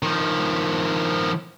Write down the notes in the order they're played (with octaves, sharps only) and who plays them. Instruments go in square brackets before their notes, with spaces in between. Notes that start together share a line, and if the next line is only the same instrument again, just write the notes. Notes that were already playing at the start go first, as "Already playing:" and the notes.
[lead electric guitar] D#3 F3